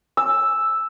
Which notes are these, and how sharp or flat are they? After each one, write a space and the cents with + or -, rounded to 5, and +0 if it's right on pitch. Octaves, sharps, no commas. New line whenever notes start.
E6 +0